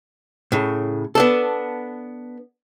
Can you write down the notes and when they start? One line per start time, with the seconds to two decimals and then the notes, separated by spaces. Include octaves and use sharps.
0.52 A2 C#3
1.15 B3 D4 A4